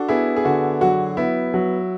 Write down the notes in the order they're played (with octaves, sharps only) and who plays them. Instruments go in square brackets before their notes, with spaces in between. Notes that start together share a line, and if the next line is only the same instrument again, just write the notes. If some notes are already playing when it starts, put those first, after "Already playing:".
Already playing: [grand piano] D4 [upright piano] F#4 A4
[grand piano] B3 [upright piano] E4 G#4
[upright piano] G#4
[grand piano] D3 [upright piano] F#4
[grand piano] F#3 [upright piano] F#4
[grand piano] B3 [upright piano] E4
[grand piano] F#3